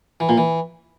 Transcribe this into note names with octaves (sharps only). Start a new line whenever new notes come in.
E3
A#2
E3